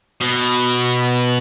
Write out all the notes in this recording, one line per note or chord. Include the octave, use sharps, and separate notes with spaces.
B2